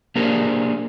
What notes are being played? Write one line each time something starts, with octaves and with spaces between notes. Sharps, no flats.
A#3 D4 G4 G#4 A#4 C5